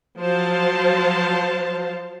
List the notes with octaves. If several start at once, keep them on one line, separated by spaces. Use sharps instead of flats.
F3 F#3 C5 F5 A5